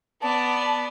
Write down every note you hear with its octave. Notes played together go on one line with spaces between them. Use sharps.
B3 D5 A5